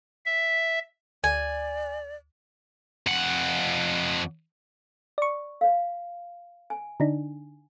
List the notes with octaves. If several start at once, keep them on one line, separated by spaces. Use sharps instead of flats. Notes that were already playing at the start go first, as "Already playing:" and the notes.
E5
D2 D5 G#5
F2 F#5
D5 C#6
C#5 F5
G#5
D3 D4 D#4